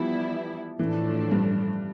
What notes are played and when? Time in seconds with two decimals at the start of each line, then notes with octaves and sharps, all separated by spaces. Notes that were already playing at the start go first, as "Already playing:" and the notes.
Already playing: E3 F3 G3 B3 E4
0.79 A2 E3 F3 A3 D4
1.31 G2